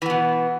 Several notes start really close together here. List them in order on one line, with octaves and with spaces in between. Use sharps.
E3 B3 B2